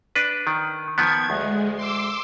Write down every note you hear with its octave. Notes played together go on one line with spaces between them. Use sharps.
D4 B4
D#3
D#3 F3 B3 G#6
D2 G#3
C6 D6 E6